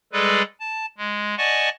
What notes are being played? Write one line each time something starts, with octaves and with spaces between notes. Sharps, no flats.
G3 G#3 G#4 A4 B4 D5
A5
G#3
D5 D#5 F#5 G#5 A5 C#6